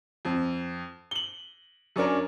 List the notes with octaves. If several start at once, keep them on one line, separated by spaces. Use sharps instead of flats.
F2
F#7 G7
F#2 C#4 D4 A#4